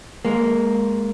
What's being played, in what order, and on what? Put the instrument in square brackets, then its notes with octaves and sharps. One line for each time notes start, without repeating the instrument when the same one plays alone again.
[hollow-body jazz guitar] G#3 A#3